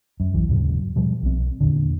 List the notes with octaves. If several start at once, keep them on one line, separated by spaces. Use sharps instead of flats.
F#2
E1 B1 E3
D#1 G#2 C#3 F#3
B2 F3 G3
B1 C4
E2 A#2 D3